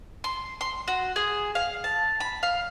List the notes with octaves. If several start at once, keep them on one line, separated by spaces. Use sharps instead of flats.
C6
C6
F#4
G#4
F5
A5
B5
F5